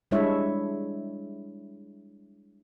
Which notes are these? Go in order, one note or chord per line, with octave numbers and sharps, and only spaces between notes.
G3 G#3 D4 E4 C#5 E5